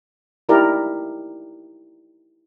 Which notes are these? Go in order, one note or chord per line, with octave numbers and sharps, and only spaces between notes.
D#4 E4 G4 A#4 D5